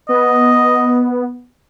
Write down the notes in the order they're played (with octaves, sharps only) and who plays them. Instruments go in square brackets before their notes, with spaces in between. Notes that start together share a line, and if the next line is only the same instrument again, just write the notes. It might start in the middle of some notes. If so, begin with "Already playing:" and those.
[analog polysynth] B3 [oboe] D#5